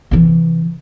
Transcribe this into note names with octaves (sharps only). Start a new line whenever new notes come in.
C3 E3